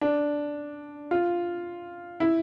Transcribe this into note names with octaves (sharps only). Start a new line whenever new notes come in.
D4
F4
E4